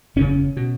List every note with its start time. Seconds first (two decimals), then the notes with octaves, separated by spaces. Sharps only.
0.16 F#1 E2 C#3 C#4
0.57 B2